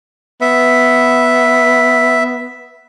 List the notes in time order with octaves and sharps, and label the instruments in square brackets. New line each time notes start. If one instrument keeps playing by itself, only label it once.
[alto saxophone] B3 [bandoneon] E5